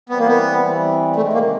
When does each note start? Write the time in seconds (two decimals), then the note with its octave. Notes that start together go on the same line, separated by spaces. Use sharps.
0.09 E3 G3 B3 C4
0.18 A#3
0.27 B3
0.62 E3 G3 C4
1.16 C3 D#3 G#3 A3
1.33 A#3